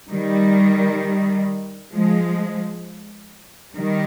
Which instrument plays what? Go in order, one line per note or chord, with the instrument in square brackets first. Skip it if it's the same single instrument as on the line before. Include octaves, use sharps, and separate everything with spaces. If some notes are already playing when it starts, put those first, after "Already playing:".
[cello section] D#3 G3
F3 G#3
D#3 G3